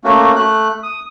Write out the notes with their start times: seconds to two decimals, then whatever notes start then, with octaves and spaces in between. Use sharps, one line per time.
0.04 A3 A#3 C#4 F#4
0.36 A3 F#6
0.83 D#6